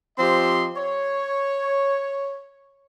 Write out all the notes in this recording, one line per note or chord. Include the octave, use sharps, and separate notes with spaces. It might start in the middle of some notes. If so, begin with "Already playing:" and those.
F3 C4 G4 D#5 C6
C#5